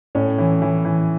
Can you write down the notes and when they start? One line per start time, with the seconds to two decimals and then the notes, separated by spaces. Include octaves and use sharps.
0.15 A2 C#4
0.38 E3
0.62 E3
0.85 E3